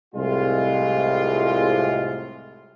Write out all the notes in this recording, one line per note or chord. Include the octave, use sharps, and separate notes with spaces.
C2 A2 G#3 F4